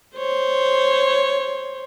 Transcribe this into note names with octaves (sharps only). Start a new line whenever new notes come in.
C5 C#5